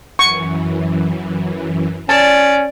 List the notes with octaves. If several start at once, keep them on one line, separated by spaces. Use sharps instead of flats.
F#2 E3 C#6
C#4 D5 A5